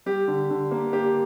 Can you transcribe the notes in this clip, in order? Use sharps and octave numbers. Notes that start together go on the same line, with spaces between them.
G3 G4
D3
D3
A#3
A#3 G4